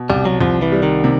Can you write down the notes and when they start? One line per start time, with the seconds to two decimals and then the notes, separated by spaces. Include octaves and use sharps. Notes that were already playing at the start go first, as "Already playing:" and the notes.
Already playing: B2
0.10 C2 G3
0.25 F#3
0.41 C2 F3
0.62 E3
0.72 G3
0.83 D#3
1.04 C3